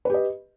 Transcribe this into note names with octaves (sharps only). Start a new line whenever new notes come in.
G4 B4 D#5